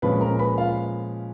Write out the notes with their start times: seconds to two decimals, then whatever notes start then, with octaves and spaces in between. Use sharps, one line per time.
0.02 A#2 F3 G#3 C#4 B4 B5
0.21 A#4 A#5
0.39 B4 B5
0.58 F4 F5